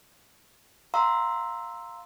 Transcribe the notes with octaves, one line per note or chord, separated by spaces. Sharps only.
F5 F#5 A#5 C6 E6